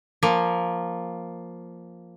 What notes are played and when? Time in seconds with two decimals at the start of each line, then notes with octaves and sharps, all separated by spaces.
0.23 F3 A#3